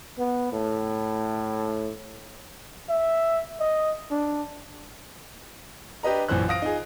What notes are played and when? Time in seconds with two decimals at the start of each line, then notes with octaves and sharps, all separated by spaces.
0.18 B3
0.52 A2
2.89 E5
3.60 D#5
4.11 D4
6.03 D4 G4 B4 D#5 A#5
6.29 A#1 F#2 E3 C5 F#6
6.48 F5 D#6 A#6 D7
6.62 D#4 F4 G#4